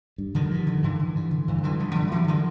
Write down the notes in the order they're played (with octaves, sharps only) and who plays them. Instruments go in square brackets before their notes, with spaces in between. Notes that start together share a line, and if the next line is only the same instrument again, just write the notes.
[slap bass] G2
D3 D#3 F3
G2
D3
G2 D3 E3
D3
G2
D3
G2 D3 E3
D3 E3 F#3
G2 F3 G3
D3
G2 E3 F#3
D3 D#3 F3